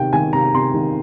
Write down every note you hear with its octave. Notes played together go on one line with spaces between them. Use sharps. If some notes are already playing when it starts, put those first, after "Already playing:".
Already playing: C3 D#3 G5
D#3 G#5
C3 A#5
C3 C6
D#3